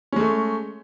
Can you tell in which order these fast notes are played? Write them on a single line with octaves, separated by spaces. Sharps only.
C#4 G#3 A3